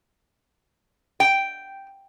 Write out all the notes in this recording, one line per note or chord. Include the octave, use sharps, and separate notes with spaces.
G5